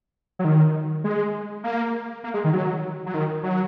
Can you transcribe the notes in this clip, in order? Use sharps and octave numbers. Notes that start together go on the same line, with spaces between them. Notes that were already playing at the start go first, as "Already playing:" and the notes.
F#3
D#3
G#3
A#3
A#3
G#3
D#3
F#3
F#3
D#3
F#3